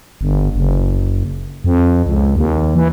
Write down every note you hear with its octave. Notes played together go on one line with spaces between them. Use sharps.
G1
F#1
F2
C#2
D#2
E3